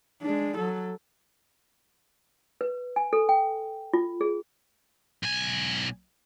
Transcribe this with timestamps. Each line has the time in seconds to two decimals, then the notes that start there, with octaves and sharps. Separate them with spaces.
0.23 G#3 D4
0.58 F#3 A4
2.61 B4
2.96 G#5
3.13 A4
3.29 G5
3.93 F4
4.21 G#4
5.23 B1 G#5